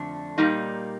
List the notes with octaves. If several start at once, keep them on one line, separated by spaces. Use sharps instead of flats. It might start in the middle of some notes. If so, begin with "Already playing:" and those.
Already playing: F2 D3 A3 D4
A#2 G3 A#3 D#4